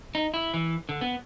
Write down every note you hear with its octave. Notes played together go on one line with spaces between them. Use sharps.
D#4
E4
E3
D3
B3